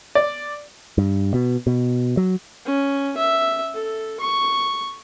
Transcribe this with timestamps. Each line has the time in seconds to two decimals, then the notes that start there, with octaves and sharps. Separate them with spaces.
0.15 D5
0.98 G2
1.34 B2
1.67 B2
2.17 F#3
2.65 C#4
3.17 E5
3.74 A4
4.20 C#6